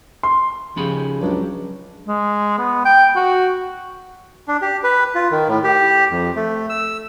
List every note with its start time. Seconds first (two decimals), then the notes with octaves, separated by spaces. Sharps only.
0.23 C6
0.76 C#3 F3 C#4 D#4 G4 G#4 B5
1.21 C#2 F#3 G#3 D4 G4
2.08 G#3
2.59 B3
2.85 G5
3.16 F#4
4.48 D4
4.62 G4
4.84 B4
5.15 F4
5.32 D#3
5.49 A2
5.64 G4
6.11 F2
6.36 A3
6.69 E6